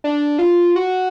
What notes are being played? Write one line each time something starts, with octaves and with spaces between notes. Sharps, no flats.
D4
F4
F#4